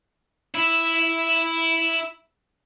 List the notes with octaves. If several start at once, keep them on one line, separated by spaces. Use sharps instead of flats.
E4 E5